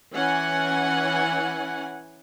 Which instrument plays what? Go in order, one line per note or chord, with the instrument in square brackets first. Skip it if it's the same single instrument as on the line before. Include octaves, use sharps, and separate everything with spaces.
[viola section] E3 C#4 F#5 G#5